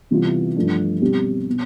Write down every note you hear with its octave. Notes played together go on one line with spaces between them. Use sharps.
C3 E3 G3 B3 F4
G2 F3 A3 D4
B2 G3 C4 G4
B2